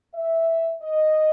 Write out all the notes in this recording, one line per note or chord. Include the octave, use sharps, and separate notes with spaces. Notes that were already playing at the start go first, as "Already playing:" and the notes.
E5
D#5